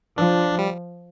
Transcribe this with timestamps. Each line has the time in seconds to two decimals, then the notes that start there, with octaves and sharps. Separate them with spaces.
0.18 F3 D4
0.59 G3